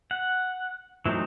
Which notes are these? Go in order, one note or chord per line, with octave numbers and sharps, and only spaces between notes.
F#5
E3 F#3 A3 C4 D#4